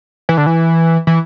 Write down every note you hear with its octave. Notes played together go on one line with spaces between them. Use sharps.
E3
D3
E3
E3